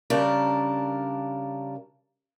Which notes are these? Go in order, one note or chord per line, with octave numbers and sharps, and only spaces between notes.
C#3 G3 D4 A4 A#4